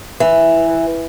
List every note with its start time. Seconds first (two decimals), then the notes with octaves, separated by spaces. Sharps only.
0.20 E3